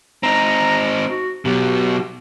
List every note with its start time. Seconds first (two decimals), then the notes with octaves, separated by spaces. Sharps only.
0.23 C4 D#4 A#5
1.08 F#4
1.45 B2 F#3 G4